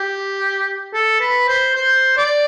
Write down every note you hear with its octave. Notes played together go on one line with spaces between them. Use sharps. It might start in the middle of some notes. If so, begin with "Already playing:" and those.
Already playing: G4
A4
B4
C5
C5
D5